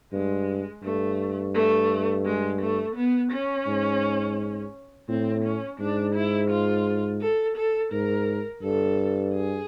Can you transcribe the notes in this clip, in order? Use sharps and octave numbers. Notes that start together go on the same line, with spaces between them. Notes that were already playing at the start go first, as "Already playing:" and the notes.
G2 G#3
G2 A3
A3
G#3
A3
B3
C#4
G#2
A2 C4
C#4
G#2 D4
E4
F4
A4
A4
G#2 A#4
G2 A4
G#4